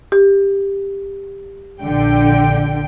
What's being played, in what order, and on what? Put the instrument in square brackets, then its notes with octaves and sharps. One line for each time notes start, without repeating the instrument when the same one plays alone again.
[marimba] G4
[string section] A#1 D3 G5